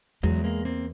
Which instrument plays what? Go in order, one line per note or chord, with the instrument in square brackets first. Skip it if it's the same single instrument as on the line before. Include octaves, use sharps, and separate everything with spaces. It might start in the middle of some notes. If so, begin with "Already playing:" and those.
[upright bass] E2 [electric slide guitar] F#3 G#3
[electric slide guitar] G#3 A#3
A#3 C4